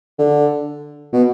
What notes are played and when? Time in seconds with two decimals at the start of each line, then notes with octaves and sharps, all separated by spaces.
0.18 D3
1.13 B2